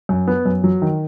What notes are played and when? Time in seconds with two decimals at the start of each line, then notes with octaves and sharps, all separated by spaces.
0.09 F#2
0.28 B3
0.46 F#2
0.64 F#3
0.82 D#3